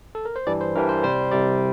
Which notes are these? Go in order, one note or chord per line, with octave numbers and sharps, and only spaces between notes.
A4
A#4
C5
G2 E3 G3 D4 D5
C5
G2 E3 G3 D4 A#4
C5
C2 C3 G3 C5
C2 C3 G3 D5